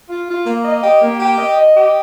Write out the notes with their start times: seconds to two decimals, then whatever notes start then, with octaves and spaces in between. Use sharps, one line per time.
0.10 F4
0.29 F4
0.46 A#3
0.65 D#5
0.83 G4
1.02 A#3
1.20 G4
1.38 D#5
1.57 D#5
1.75 G4